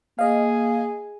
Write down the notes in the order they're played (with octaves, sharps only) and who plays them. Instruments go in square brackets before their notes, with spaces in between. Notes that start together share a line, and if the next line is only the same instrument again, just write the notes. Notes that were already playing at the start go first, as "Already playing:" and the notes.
[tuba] A#3 [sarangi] G#4 [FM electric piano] D#5 F5